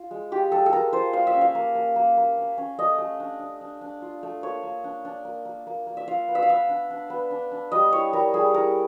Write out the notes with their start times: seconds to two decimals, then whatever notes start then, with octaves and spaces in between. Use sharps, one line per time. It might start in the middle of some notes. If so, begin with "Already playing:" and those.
Already playing: F4
0.11 G#3
0.32 F4 G4
0.52 G#3 A4
0.66 A4
0.73 G#3 A#4
0.93 F4 C5
1.13 A#3 F5
1.27 E5
1.34 C#4
1.41 F5
1.55 A#3
1.75 A#3
1.96 A#3
2.17 A#3
2.37 C#4
2.58 C#4
2.79 A3 D#5
2.98 A3
3.20 D4
3.40 D4
3.61 D4
3.81 D4
4.02 F4
4.23 A3
4.43 A#3 C#5
4.63 A#3
4.84 D4
5.05 D4
5.25 A#3
5.45 A#3
5.67 A#3
5.87 A#3
5.97 E5
6.08 F4 F5
6.28 B3
6.35 E5
6.42 F5
6.49 B3 E5
6.69 D4
6.90 D4
7.10 B3
7.31 D4
7.52 D4
7.72 G3 D#5
7.92 E4 C#5
8.13 G3 A#4
8.34 G3 G#4
8.54 E4 A#4